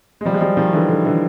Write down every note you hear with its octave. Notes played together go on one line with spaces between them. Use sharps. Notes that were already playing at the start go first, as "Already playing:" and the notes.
G#3
F3 G3
G#3
F3 G3
D#3 F3
D3 E3
D3
D3 E3